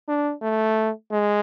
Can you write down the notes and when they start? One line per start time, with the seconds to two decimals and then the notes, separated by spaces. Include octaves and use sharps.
0.08 D4
0.42 A3
1.11 G#3